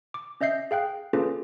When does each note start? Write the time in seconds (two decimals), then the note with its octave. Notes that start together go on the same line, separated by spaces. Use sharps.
0.14 D6
0.41 C#4 D#5 E5 G6 C7
0.71 G#4 F5 G5 F#6
1.13 A#3 C#4 F4 G#4 A4 B4